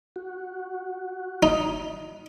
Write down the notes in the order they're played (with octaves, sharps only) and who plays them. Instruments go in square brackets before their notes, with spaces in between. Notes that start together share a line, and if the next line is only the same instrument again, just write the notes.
[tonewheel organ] F#4
[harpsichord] D#4